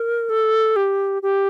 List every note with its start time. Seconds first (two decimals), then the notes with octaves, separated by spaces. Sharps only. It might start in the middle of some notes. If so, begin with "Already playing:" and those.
Already playing: A#4
0.30 A4
0.76 G4
1.22 G4